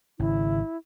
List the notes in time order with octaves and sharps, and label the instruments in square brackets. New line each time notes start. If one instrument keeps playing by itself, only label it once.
[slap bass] G#1 [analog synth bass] C#3 [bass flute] E4